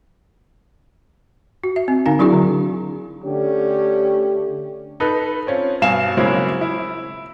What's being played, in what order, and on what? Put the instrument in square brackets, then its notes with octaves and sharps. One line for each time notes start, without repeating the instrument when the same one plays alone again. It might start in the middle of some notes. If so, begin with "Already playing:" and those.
[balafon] F#4
E5
C4
D3 D#4 F5 G#5
F#3 D4 E4 F#4 G#4
D3
[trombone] D3 [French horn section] A3 C#4 G4
[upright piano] D#4 A4 B4
C4 C#4 F4
G2 B2 F5 G#5 E7
C#3 F#3 G#3 A#3 C4 E4
E4